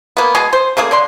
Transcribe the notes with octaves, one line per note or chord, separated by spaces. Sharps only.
A#3 B3
B2 G#3 G#4
C5
C#3 A3 A#3 G#4
D3 D5 C6